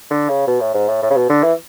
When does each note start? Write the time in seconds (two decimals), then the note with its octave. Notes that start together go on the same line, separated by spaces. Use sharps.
0.11 D3
0.29 C#3
0.47 B2
0.61 A2
0.75 G#2
0.88 A2
1.03 A2
1.10 C#3
1.16 B2
1.30 D3
1.43 E3